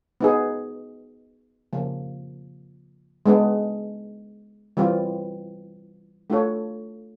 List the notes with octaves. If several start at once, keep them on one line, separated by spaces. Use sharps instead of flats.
B3 D#4 G#4
C#3 F3 A#3
G#3 B3 D4
E3 G3 C4 F4
A3 D4 F4 A4 C#5